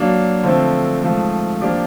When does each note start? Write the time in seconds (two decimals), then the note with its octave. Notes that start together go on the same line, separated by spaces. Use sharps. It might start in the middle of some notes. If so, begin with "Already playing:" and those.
Already playing: F#3 A#3 D4
0.43 D3 F3 A3 C4
1.02 G#2 F3 A3
1.61 F3 A#3 D4 G4